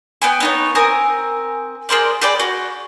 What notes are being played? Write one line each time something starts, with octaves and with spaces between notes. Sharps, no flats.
B3 G5 G#5
B3 D#4 C#5
C4 A#4 G#5 D#6
G#4 A#4 C5 D5
G#4 B4 D5 G5
F#4